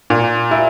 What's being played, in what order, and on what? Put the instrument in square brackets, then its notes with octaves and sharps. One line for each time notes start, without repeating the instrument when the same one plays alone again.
[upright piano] A#2
E4